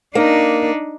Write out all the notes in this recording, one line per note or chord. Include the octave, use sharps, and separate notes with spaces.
A#3 D4 D#4